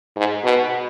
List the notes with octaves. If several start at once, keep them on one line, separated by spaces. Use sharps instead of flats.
G#2
B2